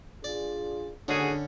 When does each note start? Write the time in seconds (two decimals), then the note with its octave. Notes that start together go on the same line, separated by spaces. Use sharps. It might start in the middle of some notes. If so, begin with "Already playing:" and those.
0.24 D4 F4 G#4 D5
1.08 D#2 A2 D3 C#4 D4 F#4 G#4 A4